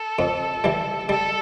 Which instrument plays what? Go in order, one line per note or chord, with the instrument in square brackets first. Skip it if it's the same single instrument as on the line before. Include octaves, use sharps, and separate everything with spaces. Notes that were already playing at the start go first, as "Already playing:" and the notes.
Already playing: [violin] A4
[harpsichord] F2
E3 G3
[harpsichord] G3 [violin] A4